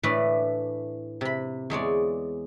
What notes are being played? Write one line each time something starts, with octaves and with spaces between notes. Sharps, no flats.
A2 E3 A3 D4 B4 D5
C3 B5
E2 G#3 C#5 D5